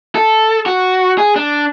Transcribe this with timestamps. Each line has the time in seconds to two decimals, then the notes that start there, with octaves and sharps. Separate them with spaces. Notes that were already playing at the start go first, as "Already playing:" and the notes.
0.15 A4
0.66 F#4
1.18 G#4
1.36 D4